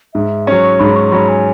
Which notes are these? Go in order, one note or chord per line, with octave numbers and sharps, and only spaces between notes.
G#2 E5
F#3 C#4 C#6
G#2 B5
C#6
F#3 C#4 B5
G#5